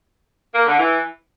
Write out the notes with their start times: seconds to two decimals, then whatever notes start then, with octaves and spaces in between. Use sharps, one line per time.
0.55 A#3
0.66 D3
0.77 E3